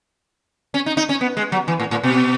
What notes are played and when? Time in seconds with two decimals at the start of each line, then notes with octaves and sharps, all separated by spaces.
0.74 C#4
0.86 D#4
0.97 D#4
1.09 C#4
1.21 B3
1.37 G#3
1.52 F#3
1.68 E3
1.80 A2
1.91 A2
2.03 B2